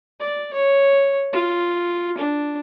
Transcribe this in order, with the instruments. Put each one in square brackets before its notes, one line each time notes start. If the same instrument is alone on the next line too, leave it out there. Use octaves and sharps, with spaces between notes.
[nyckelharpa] D5
C#5
F4
D4